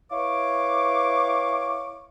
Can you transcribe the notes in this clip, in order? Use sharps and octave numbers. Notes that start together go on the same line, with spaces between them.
E4 B4 C#5 F5 C#6 D6